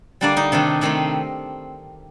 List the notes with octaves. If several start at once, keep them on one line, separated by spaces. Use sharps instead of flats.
D3 G3 A#3 D4 D5
D#4
C3 D#3 A3 D4
C3 D#3 A3 C4 D#4